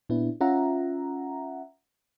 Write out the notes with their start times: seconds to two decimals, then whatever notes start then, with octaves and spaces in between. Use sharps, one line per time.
0.09 A#2 B3 D4 E4
0.41 C#4 F4 E5 F#5 A#5